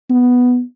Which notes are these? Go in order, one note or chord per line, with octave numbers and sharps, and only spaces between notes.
B3